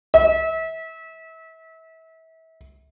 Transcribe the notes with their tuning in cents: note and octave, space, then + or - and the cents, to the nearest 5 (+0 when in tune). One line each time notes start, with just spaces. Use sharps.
E5 -30